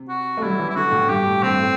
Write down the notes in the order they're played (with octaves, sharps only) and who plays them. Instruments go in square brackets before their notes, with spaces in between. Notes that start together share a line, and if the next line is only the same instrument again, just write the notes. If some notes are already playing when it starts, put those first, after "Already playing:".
Already playing: [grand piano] C3
[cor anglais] F#4
[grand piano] A3
[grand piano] G3 [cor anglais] E4
[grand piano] F#3
E3
[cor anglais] E4
[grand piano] D3 [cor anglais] F#4
[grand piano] A2
[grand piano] G2 [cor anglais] G4
[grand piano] A2
[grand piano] A2 [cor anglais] C4
[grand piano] G2
A2